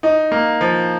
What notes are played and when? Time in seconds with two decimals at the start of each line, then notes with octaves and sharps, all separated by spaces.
0.03 D#4
0.32 A#3
0.61 F3